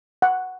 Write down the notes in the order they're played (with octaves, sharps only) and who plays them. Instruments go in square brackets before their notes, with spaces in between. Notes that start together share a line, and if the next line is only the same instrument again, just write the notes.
[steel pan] F#5